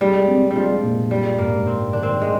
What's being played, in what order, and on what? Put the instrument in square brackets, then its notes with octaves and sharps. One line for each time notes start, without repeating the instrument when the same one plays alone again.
[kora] G3 [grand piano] G#3
[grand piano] C4
[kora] G3
[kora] F3 [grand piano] G#3
[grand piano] A#2
[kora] G3 [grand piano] G#3
[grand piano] G#2 [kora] A#3
[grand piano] G#2 [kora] C4
[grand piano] D#3 [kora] D4
[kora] C4
G#3